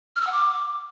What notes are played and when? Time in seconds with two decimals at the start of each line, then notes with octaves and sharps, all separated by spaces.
0.16 F6
0.21 E6
0.27 F#5
0.32 D6